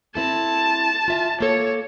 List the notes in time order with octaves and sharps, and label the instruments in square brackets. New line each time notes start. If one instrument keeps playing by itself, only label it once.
[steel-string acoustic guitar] C4 E4 A4 [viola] A5
[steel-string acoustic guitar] F4 E5 G#5
[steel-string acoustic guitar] A#3 A4 [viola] C#5